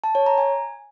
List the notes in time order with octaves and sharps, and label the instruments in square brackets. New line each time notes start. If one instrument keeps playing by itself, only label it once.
[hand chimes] A5
C#5
A#5
G#5